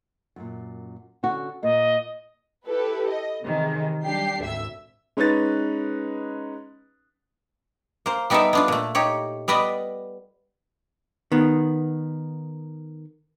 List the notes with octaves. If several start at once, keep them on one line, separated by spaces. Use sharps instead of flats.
F#2 A#2
D3 C#4 F#4
A#2 A#3 D#5
E4 G4 A4 B4
D#5
C3 D#3 E3 G#3
F#3 G3 D4 G4 C7
G#1 D2 E5 E6
G#3 C#4 D#4 B4 A6
A#3 C5
G3 B3 D#4 A4 A#4 E5
B3 D4 F4
A#2 A3
D#4 G4 C#5
G3 B3 B4 D5 D#5
D#3 B3